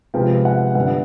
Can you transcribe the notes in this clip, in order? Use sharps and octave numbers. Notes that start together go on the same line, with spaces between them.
C3 F3 G#3 B3 F5 G5
E5 F#5
G2 D3 G3 B3 E5 F#5